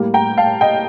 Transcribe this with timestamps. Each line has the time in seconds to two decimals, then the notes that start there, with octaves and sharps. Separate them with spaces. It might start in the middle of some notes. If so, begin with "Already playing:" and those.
Already playing: A2 G3 A#3
0.14 G5 A#5
0.37 F5 A5
0.61 D#5 G5